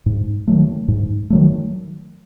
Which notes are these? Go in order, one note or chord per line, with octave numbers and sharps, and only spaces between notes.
G#2
D#3 F#3 A3
G#2
D#3 F#3 A3